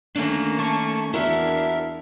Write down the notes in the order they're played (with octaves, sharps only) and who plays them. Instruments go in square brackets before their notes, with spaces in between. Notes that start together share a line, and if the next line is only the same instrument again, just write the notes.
[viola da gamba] D#3 A#3 C#4 [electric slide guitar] A3 D4
[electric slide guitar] A3 [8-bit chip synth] A5 C#6
[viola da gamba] E2 D4 [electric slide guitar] E4 F#4 [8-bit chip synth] A#4 E5